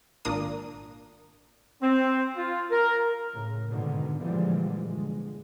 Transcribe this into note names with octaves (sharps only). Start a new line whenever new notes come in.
G#1 A#2 A#3 D4 A#4 D#6
C4
F4
A#4
A2 C#3
G#2 B2 D3 D#3
A#2 D3 E3 F3 G3 G#3
G1 G#3